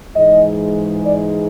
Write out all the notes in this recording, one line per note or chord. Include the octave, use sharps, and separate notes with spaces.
G#2 E3 G#3 D#5
D5